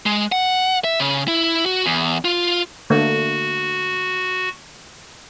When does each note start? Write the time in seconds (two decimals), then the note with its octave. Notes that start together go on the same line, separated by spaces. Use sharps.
0.06 G#3
0.32 F#5
0.84 E5
1.00 C#3
1.28 E4
1.66 F#4
1.86 E2
2.25 F4
2.90 D3 A3 A#3 F#4